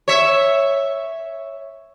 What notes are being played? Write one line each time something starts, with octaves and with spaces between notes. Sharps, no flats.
C#5 E5